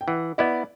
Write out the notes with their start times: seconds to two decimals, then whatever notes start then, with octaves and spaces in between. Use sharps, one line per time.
0.01 G5
0.08 E3 F#5
0.38 B3 E4 D5